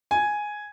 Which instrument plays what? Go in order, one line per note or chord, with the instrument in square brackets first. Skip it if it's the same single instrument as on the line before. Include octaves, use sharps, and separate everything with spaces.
[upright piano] G#5